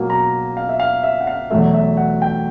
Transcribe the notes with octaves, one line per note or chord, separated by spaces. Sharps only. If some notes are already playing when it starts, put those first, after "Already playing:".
Already playing: B2 F#3 A#3
A#5
F5
E5
F5
E5
F#5
F5
E2 B2 F#3 A3 E5
E5
F#5
G5